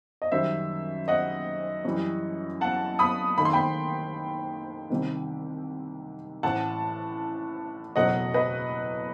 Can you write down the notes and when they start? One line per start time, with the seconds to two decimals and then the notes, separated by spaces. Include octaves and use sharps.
0.22 D#5
0.32 F#2 D#3 G3 C5 E5
1.08 D#5 F#5
1.85 F#2 E3 G3
2.61 F#5 A5
2.99 B5 D#6
3.37 D#2 D#3 A3 B5
3.45 C6
3.53 G5 B5
4.90 C2 C3 D#3
6.43 A1 A2 E3 F#5 A5
7.96 F#1 E2 B2 F#3 A3 D#5 F#5
8.34 B4 D#5